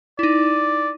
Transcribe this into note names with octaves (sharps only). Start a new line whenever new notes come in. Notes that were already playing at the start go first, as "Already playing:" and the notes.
D#4 E4 D5